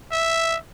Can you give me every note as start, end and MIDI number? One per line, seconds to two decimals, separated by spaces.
0.12 0.57 76